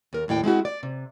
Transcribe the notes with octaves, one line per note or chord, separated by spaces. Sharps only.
D#2 A#4
D#2 A2 D5 G5
G#3 C4 E4 F#4
D5
C3